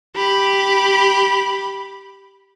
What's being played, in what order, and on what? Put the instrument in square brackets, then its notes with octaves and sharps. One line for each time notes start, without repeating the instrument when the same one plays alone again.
[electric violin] G4 B5